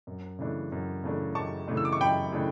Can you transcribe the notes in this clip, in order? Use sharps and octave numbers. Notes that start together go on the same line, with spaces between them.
F#2
C#3 E3 A3 D4
F#2
C#3 E3 A3 D4
F#2 A5 C#6
C#3 E3 A3 D4
E6
D6
C#6
F#2 G5 B5
C#3 E3 A3 D4